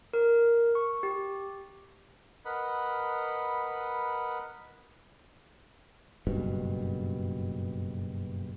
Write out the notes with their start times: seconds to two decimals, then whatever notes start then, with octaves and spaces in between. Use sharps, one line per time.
0.13 A#4
0.75 C#6
1.03 G4
2.45 A#4 B4 D#5 F#5 B5
6.27 F#1 G2 B2